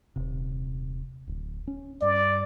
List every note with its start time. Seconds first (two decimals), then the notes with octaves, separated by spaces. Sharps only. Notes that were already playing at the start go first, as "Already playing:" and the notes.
0.16 D#1 C3
1.27 D1
1.67 C#4
2.02 G2 D5